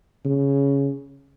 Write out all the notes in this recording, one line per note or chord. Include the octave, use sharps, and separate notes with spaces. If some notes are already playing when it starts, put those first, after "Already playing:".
C#3